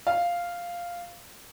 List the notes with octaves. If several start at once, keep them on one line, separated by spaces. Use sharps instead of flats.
F5